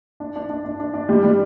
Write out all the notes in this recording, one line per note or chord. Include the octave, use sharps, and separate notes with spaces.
D4
D4
D4
D4
D4
D4
G3
G3